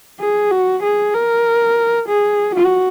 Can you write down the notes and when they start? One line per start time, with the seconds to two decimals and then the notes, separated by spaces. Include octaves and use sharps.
0.20 G#4
0.51 F#4
0.83 G#4
1.14 A#4
2.08 G#4
2.54 F#4